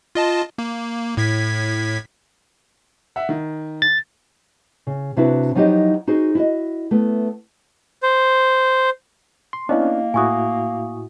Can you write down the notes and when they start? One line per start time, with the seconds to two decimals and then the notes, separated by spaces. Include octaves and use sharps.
0.15 F4 D#5 A5
0.58 A#3
1.17 A2 G#6 B6
3.16 E5 F#5
3.29 D#3
3.82 A6
4.87 C#3
5.16 C3 D4 E4 F#4 B4
5.55 F3 F#3 D#4 E4 G4 D#5
6.07 D#4 F#4 G#4 C5
6.35 E4 F#4 D#5
6.91 A3 B3
8.03 C5
9.53 C6
9.69 A#3 B3 C#4 D4 E4 D#5
10.14 A2 E4 F#4 G#5 C#6 D#6